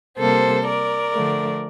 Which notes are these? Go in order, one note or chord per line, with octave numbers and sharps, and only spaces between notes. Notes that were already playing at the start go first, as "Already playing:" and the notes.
C3 G3 A#3 A4 C5
A#4 D5
D3 F3 A3